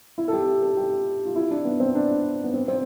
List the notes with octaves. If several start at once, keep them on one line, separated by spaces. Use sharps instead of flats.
E4
A4
G4
A4
G4
F4
E4
D4
B3
C4
D4
B3
C4
C4